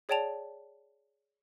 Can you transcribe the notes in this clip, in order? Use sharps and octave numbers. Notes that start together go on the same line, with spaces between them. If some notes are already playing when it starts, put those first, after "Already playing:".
G#4 C#5 D5 G5 A5 F7